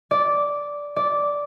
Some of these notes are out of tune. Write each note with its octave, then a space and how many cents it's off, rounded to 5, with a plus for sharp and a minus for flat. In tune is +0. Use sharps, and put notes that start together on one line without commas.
D5 -10
D5 -10